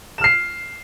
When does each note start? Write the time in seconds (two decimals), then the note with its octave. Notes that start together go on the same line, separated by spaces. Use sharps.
0.18 E7
0.21 F6
0.24 C7